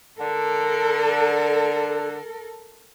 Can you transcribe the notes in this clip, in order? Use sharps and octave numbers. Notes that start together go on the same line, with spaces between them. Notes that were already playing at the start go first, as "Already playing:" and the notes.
D3 A4 A#4